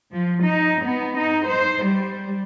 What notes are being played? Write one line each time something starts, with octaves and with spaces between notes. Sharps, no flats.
F3
D#4
B3
D#4
C5
G3